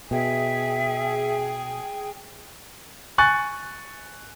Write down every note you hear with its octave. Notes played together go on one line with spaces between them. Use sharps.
B2 G#4 E5 G5
G#5 C#6 F#6 A6